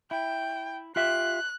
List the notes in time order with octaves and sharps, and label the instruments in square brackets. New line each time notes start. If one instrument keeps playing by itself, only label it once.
[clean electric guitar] E4 [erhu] G5
[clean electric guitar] F4 G4 E5 [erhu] F#6